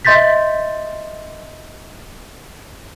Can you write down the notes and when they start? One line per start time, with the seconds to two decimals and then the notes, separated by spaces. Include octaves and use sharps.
0.05 D#5 E5 C6 G6 A6 B6